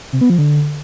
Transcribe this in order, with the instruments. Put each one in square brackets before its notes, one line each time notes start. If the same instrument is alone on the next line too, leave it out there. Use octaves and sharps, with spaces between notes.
[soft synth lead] C3
B3
F3
D3